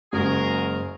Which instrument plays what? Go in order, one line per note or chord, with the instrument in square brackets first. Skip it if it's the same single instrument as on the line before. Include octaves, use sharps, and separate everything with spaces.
[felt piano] F#1 G#3 [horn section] F#4 G#4 A#4